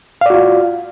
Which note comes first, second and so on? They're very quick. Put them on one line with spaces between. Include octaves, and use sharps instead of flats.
F5 D5 F#4 F4